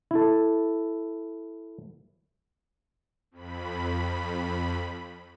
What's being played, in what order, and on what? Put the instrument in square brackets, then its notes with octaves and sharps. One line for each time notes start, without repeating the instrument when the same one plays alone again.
[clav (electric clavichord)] E4 A4
[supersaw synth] F2 B5